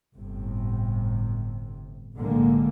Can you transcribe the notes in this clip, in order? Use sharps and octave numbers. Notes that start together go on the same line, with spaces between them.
G1 A2 C3
B1 A2 D3 G#3 A#3